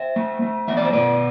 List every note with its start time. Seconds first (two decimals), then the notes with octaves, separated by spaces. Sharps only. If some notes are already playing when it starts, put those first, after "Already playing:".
Already playing: C5 E5
0.16 A3
0.42 A3
0.68 E2 E5
0.77 D5
0.85 C5
0.93 B2 B4 D5